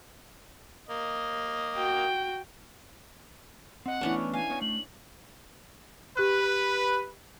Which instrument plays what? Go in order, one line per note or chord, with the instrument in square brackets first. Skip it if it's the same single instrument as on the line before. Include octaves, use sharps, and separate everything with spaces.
[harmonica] A#3 D#5
[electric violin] F#4 G5
[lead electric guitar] C4 D#5 [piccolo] F#5
[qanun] E3 C#4 D4 [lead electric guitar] A3 B3
[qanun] F5 [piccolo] G#5
[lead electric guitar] B3 C#5
[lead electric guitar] A3 [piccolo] F#7
[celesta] G4 F#6 [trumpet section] B4